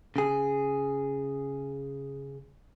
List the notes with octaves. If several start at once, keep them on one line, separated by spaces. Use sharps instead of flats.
C#3 G#4